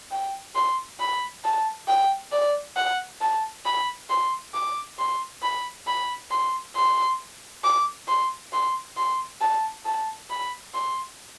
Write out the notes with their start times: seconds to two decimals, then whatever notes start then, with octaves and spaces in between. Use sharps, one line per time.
0.11 G5
0.55 C6
1.00 B5
1.44 A5
1.88 G5
2.32 D5
2.76 F#5
3.21 A5
3.65 B5
4.10 C6
4.54 D6
4.98 C6
5.42 B5
5.87 B5
6.31 C6
6.76 C6
7.64 D6
8.08 C6
8.53 C6
8.97 C6
9.41 A5
9.85 A5
10.30 B5
10.74 C6